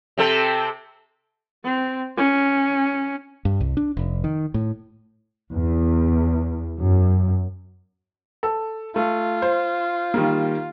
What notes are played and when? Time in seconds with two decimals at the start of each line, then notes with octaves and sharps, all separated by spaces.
0.18 C3 C4 A4
1.64 C4
2.17 C#4
3.45 G2
3.61 C2
3.77 D4
3.97 F1
4.24 D#3
4.54 A2
5.52 E2
6.80 F#2
8.43 A4
8.96 A3 F4
9.42 C5
10.14 D#3 G3 A#3